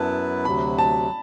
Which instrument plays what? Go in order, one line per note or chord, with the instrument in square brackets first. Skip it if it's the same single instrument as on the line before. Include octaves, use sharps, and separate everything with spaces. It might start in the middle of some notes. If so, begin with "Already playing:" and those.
Already playing: [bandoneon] F#2 F#3 B3 E4 B4 [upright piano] A5
[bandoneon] D2 C3 F#3 [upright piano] B5
[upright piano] A5